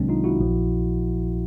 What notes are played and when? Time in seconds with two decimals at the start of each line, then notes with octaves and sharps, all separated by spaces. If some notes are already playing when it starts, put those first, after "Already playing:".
Already playing: C2 C3 D#3 F#3 G#3 C4 D4
0.09 D#4 F4
0.24 E4 F#4
0.40 A#1 A#2 F3